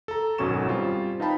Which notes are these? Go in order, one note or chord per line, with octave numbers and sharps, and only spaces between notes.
A4 A#5
G#1 F#2 B2 C#4 C#6 E7
G3 C4 F4
D#4 B4 F5 G5 A5 B5